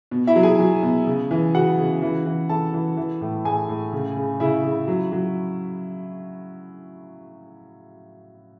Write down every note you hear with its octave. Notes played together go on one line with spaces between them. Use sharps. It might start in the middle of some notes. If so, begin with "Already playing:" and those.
B2
E4 E5
F#3
G#4 G#5
F#3
B2
C#3
E3
C#3 F#4 F#5
C#3
E3
E3
E3 A4 A5
E3
E3
A2
A2 G#4 G#5
A2
C#3
C#3
C#3 E4 E5
C#3
F#3
F#3